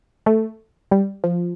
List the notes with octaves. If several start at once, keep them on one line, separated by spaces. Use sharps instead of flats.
A3
G3
F3